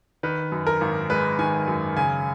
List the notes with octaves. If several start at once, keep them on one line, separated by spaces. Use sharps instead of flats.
D#3 B4
F#2
A#4
G#1
G#3 B4
D#3 G#5
F#2
C#3 G#5